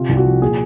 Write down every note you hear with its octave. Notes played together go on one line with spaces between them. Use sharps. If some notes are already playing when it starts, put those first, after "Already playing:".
Already playing: C3 F4
C2
F#4
F3
A#2 G#4